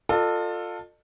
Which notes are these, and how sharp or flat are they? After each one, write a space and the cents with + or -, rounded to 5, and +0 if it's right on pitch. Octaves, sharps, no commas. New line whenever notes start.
F4 +20 A4 +20 D#5 -40